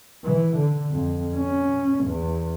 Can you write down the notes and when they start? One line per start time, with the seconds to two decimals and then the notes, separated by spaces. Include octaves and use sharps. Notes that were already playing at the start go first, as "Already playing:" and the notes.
0.24 E3
0.56 D3
0.92 F2
1.36 C#4
2.05 E2